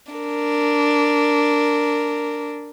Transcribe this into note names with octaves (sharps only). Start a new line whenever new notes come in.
D4 A#4